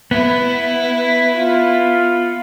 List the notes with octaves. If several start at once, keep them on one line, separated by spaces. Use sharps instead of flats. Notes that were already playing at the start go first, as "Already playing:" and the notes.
B3 E4 B4
F4